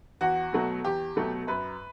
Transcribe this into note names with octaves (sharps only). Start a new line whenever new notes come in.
E2 F#4
B2 F#3 A3
E2 G4
B2 F#3 A3
F#2 B4